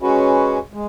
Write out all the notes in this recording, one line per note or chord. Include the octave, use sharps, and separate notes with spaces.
G#3 C#4 F#4 B4
G#3